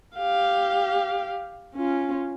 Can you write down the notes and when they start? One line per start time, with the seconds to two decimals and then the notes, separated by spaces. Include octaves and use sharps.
0.17 G4 F5
1.75 C#4 F4